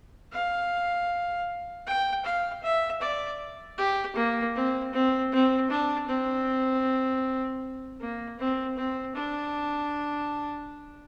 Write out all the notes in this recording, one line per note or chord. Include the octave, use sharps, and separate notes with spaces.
F5
G5
F5
E5
D5
G4
A#3
C4
C4
C4
D4
C4
A#3
C4
C4
D4